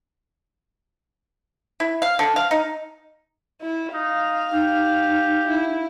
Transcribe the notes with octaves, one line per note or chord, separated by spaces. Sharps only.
E4
F5
D3
F5
D#4
E4
D#4 F5
D#4 G4
E4